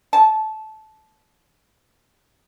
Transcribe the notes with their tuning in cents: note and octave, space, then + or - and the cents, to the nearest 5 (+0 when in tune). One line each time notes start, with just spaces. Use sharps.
A5 -15